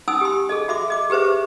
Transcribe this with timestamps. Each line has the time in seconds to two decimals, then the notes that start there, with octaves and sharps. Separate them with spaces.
0.08 C#4 D#4 G#5 D#6 E6
0.21 G4 C6
0.49 G#4 A4 D#5
0.68 F#4 E5 C6 D6
0.88 G#4 D#5 D6
1.10 G4 G#4 B4 C5 E5